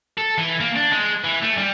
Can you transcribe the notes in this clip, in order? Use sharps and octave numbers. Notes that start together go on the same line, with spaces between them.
A4
E3
A#3
D4
G#3
E3
A3
G3